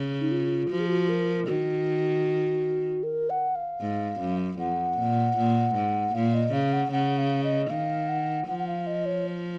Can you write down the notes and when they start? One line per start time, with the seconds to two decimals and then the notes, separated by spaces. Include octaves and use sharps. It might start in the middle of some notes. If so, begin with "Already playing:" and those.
Already playing: C#3
0.21 D#4
0.31 F4
0.70 F3 F#4
0.79 G#4
0.88 F#4
1.09 A#4
1.48 D#3 F#4
3.03 A#4
3.30 F#5
3.55 F5
3.81 G#2
4.20 F#2
4.59 F2 F#5
4.98 A#2
5.37 A#2
5.75 G#2
6.14 A#2 F5
6.34 D#5
6.53 C#3 F5
6.73 F#5
6.92 C#3 F#5
7.18 F5
7.44 D#5
7.70 D#3 F5
8.08 F#5
8.47 F3 F#5
8.58 F#5
8.67 F5
8.87 D#5
9.06 C#5